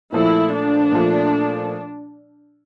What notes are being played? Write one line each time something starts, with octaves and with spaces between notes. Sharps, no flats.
A#2 F3 A3 E4
D4
A#2 F3 A3